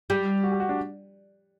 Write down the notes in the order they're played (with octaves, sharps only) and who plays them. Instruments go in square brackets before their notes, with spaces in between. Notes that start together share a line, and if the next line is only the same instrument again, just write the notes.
[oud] G3 [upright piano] G4
[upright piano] F#4
G4
F#4
D4